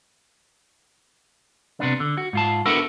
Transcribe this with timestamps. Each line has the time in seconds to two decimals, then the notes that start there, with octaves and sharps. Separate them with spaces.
1.80 C3 B3 D4
2.00 D3
2.18 F#4
2.33 G#2 F4 A5
2.66 B3 D4 E4 F#4 A4 A#4